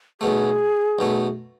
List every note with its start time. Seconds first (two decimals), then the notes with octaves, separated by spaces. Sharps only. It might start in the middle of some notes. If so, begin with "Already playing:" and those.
0.21 B1 B2 A3 G#4
0.99 B1 B2 A3